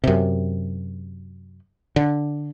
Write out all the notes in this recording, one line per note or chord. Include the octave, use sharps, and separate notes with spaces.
F#2 C3
D3